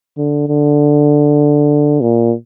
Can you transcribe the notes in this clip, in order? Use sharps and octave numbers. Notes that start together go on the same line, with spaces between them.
D3
D3
A#2